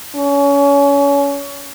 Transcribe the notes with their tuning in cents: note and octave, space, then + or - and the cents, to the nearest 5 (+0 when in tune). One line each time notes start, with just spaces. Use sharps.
C#4 +30